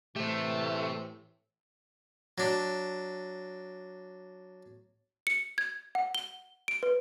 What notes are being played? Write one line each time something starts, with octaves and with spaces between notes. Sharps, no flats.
A2 E3 A3 G4 C5
F#3 D4
C#7
G#6
F#5
G7
D7
B4